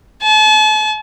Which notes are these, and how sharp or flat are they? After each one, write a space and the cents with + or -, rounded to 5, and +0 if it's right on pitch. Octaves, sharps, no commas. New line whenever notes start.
A5 -40